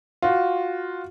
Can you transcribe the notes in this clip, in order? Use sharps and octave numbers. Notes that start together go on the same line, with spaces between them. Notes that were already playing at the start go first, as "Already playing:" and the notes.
F4 F#4